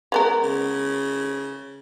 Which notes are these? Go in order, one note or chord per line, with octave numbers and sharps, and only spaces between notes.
G#3 B3 A#4
C#3